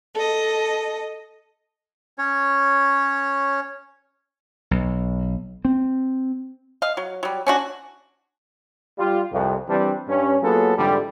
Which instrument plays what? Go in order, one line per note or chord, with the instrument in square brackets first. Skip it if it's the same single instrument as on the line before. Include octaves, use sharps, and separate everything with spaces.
[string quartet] A4 D#5
[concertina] C#4 C#5
[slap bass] B1
C4
[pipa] D#5 F5
F#3
F#3 G3
C#4 D4 F#4
[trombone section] G3 F4
C2 F2
E3 G3 C4 D4
G2 C#4
F#3 A#3 B3 F4 G#4 A4
F2 G#2 D3 E3 G3